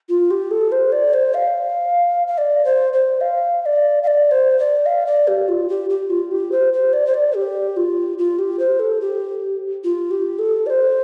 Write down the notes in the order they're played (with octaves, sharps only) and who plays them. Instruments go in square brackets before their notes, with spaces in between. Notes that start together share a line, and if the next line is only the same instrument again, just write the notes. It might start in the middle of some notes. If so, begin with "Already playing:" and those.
[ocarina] F4
G4
A4
C5
D5
C5
F5
F5
D5
C5
C5
F5
F5
D5
F5
D5
C5
D5
F5
D5
G4
F4
G4
G4
F4
G4
C5
C5
D5
C5
D5
G4
F4
F4
G4
C5
A4
G4
F4
G4
A4
D5
C5